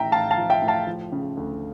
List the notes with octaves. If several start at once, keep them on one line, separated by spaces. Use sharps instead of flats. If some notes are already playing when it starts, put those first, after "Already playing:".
Already playing: A1 A2 E5 G5 A#5
A1 F5 A5
F5 A5
F3
E5 G5
A2
F5 A5
F3
C#3
D2